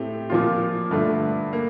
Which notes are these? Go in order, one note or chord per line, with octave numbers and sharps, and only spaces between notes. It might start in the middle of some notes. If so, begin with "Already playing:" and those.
Already playing: A2 A3 C4 G4
A#2 F3 A#3 F4
G2 D3 A3
A#3